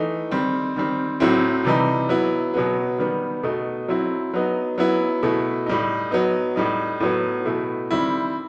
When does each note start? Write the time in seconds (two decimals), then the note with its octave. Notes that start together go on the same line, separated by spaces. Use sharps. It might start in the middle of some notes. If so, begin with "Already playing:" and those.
Already playing: E3 A3 D#4
0.31 D#3 G3 C4
0.76 D#3 G3 C4
1.20 A2 F#3 C4 E4
1.65 C3 E3 G3 D#4
2.09 F#3 B3 E4
2.54 B2 F#3 B3
2.98 D#3 G3 B3
3.43 B2 A3 D#4
3.88 F#3 C4 E4
4.34 F#3 B3 D#4
4.78 F#3 B3 E4
5.23 B2 A3 E4
5.66 A2 G3 D#4
6.11 F#3 B3 D#4
6.56 A2 G3 D#4
7.00 A2 F#3 B3
7.46 B2 A3 E4
7.91 D#3 G3 C4 E4